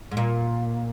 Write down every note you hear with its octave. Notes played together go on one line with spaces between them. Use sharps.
G#2
A#2